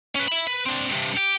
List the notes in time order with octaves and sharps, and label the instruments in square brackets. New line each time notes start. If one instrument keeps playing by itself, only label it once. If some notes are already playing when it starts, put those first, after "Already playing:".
[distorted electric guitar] C#4 B4
E5 B5
B4
C4 D4
G2 C3
G4